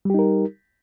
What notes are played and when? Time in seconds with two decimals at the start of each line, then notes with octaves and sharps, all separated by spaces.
0.05 G3
0.10 G4
0.14 D#4
0.19 A#4